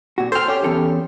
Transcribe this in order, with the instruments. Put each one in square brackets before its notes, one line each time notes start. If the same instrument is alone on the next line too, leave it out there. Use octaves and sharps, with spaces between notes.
[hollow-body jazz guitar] A#2 F#4
[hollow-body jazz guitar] A4 G5 [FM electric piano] C5 F6
[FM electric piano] C#4 G4
[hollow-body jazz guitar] E2 A4